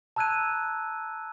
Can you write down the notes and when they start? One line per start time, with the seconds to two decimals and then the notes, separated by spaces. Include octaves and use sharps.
0.16 A5 A#5 E6 F#6 G#6 D#7